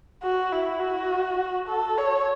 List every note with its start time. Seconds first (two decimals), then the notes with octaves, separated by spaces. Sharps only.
0.23 F#4
0.52 E4
0.81 F#4
1.68 A4
1.97 C#5